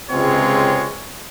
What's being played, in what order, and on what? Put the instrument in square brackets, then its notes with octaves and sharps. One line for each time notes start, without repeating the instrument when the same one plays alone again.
[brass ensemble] C#2 C3 G#3 C4 F4 C#5